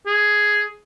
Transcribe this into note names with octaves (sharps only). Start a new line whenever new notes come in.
G#4